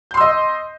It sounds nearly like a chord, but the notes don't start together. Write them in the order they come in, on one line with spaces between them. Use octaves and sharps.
G6 C6 E6 D#5